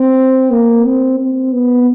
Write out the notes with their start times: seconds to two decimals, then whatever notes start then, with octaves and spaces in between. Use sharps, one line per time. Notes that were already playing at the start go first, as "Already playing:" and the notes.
Already playing: C4
0.52 A#3
0.86 C4
1.20 C4
1.53 B3